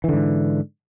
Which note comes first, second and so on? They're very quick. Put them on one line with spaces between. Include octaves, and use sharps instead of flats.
E3 D3 G#2